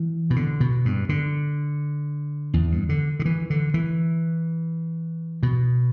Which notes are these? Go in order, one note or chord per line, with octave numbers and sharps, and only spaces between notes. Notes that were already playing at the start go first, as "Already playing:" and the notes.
Already playing: E3
B2
D3
B2
G2
D3
E2
G2
D3
D3
E3
D3
E3
B2